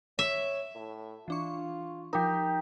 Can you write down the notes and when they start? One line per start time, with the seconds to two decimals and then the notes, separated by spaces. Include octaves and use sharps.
0.19 C#5 E5
0.75 A2
1.28 E3 D4 F4 C#6
2.13 F3 D#4 G4 A#4